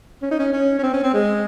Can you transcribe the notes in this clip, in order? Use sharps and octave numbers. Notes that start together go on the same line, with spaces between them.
C#4
D#4
C#4
C#4
C#4
C4
C#4
C4
G#3